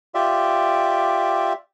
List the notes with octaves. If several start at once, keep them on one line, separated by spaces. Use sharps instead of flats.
F4 G4 D5 E5